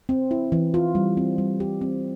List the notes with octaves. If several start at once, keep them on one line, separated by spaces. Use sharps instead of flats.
C4
E4
E3
F4
G3
C4
G3
G4
C4